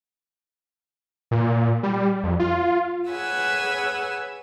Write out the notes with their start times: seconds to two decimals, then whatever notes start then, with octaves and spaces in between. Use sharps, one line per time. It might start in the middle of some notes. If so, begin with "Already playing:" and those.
1.31 A#2
1.83 G3
2.24 F2
2.39 F4
3.11 G#4 B4 C#5 F#5 G#5 E6